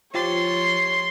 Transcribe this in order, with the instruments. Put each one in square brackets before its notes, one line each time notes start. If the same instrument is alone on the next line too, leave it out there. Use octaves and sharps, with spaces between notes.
[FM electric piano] F3 G4 A6 [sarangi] C#5 [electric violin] C6